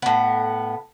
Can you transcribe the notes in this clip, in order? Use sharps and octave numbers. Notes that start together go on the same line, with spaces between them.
A2 B3